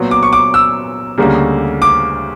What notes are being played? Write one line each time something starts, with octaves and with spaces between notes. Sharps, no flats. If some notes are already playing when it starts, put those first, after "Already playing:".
Already playing: A#2 F#3 B3
D6
C#6
D6
E6
D2 C#3 G3 A#3
D6